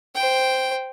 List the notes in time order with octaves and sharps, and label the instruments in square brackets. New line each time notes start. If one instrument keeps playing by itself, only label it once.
[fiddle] C5 G5